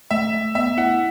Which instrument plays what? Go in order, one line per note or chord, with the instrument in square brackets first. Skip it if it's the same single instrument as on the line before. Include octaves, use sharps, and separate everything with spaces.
[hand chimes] A3 [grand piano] E5
[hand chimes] A3
[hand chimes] B3 [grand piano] E5
[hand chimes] E4 [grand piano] F#5